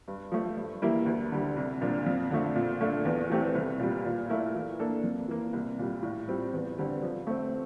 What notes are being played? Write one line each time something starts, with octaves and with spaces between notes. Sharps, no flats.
G2
F3 A3
G2
E3 G3 A#3 E4
D2
D3 G3
C2
A#2 F3 A#3 D4
F2
D3 F3 A3
A#2
A3 D4 A4
E2
E3 A3 C4 G4
C2
A#2 G3
A#2
A3 E4 A#4
E3
A#3 D4 A4
F2
E3 A#3
C2
A#2 G3
A2
G3 C4 F4
E2
D3 G3 C4
F3
A3 C4